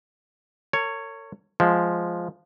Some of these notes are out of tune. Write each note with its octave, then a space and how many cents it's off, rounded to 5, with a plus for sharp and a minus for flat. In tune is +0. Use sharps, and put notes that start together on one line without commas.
A#4 -45 C#5 +0
F3 +0 G#3 +0